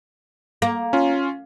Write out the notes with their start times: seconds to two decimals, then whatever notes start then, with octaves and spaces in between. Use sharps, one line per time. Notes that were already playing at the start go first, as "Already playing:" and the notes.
0.62 A#3
0.93 C#4 F4